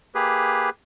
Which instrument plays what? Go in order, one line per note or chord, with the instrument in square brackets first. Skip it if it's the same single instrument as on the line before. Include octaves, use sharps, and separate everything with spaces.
[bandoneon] A#3 G4 G#4 B4